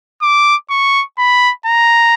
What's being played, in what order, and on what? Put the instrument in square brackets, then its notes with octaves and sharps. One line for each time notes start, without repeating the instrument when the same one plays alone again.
[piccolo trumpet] D6
C#6
B5
A#5